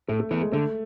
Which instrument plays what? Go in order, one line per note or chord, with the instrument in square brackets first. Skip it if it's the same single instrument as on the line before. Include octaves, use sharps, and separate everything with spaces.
[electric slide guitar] A2 [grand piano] A3
[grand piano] A3
[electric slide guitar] E3 B3 [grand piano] A3
[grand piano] G#3
[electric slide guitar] D3 [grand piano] A3